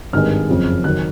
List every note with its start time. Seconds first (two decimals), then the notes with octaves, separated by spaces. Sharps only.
0.13 G#1 G2 D#3 G#3 F6
0.49 F#1 F2 C#3
0.84 D#3 F#3 F#6